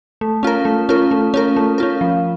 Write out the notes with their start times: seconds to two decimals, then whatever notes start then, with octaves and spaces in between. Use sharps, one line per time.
0.21 A3
0.43 C#4 F4 A#4
0.65 A3
0.89 C#4 F4 A#4
1.11 A3
1.34 C#4 F4 A#4
1.56 A3
1.78 C#4 F4 A#4
2.01 F3